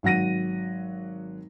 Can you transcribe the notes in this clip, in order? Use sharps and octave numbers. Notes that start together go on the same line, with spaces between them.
G#1 F#3 F#5 A#6 D#7